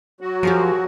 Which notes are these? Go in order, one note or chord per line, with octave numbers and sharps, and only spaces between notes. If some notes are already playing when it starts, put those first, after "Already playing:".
F#3 F#4
F3 G4 G#4 A#4